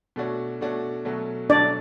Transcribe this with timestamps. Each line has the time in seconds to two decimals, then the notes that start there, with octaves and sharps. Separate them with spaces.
0.16 B2 A3 D4 F#4 C#5
0.61 B2 A3 D4 F#4 C#5
1.05 B2 F#3 A3 C#4
1.49 B2 F#3 A3 C#4 D4 D5